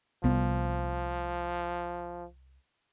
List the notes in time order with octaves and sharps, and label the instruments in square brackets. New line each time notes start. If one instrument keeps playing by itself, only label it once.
[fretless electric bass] C2 B3 [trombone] F3